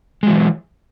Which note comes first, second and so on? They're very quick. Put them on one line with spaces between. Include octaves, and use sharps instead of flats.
G#3 F#3 E3